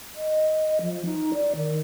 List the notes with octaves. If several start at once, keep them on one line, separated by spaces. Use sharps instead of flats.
D#5
F3
D#4
D5
D#3